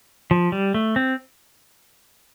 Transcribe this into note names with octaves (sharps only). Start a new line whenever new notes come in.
F3
G3
A3
C4